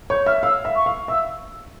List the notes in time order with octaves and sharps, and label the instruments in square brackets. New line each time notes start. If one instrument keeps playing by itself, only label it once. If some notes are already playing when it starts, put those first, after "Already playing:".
[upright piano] C#5 [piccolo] G6
[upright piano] E5 [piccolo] F6
[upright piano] F5 [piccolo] E6
[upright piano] E5
[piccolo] C#6
[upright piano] F5
[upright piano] E5 [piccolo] E6